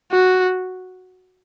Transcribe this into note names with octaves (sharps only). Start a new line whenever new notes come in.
F#4